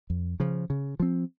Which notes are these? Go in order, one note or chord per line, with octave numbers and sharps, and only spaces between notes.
F2
C#3 F3
C#3
F3 C4